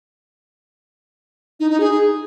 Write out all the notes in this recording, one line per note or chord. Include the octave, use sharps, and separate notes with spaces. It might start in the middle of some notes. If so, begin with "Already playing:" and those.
D#4
D#4
G#4